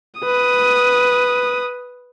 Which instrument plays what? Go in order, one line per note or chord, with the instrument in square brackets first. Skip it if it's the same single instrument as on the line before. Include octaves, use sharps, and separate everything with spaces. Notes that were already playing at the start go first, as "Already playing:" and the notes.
[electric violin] B4 D#6